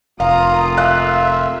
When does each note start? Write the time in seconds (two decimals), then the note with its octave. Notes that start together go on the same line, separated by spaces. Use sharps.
0.20 F1 A#3 F4 F5 A#5 D#6
0.77 E5 F5 F#6